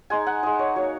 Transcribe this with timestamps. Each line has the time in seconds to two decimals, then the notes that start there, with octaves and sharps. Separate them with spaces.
0.10 G#3 D#4 G#5
0.26 F#5
0.43 G#3 D#4 D#5
0.59 C#5
0.76 F#3 A#3 D#4 C#5